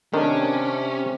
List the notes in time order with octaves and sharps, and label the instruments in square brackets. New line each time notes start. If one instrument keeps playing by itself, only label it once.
[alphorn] C3 [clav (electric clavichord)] D#3 [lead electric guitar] C#4 [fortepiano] D4